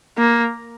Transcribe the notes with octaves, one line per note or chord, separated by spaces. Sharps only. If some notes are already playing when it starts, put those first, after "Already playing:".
A#3